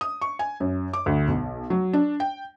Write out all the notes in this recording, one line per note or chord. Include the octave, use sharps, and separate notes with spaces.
D#6
C#6
G#5
F#2
D6
D2
B1
F#3
D4
G5